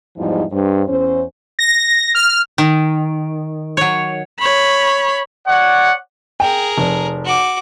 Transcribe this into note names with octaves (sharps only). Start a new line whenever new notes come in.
E2 G#2 F3 G3 D#4 E4
G2 C5
E2 C#4 C5
A#6
F6
D#3
F#3 C#5
C#5 B5
C#5 D5 F#5
G#4 A#4 G5
F1
F#4 D6